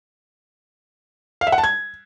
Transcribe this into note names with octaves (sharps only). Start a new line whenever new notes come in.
F5
E5
F#5
A5
G#6